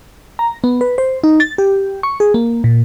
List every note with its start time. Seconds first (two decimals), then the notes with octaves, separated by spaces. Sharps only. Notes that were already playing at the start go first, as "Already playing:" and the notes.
0.39 A#5
0.64 B3
0.81 B4
0.98 C5
1.24 D#4
1.40 A6
1.58 G4
2.03 C#6
2.20 G#4
2.34 A#3
2.64 A#2